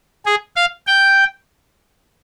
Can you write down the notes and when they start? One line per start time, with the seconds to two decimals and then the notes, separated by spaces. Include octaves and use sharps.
0.26 G#4
0.56 F5
0.87 G5